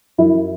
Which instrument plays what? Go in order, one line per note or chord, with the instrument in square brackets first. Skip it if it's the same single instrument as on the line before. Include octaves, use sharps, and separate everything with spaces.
[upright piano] F#2 E4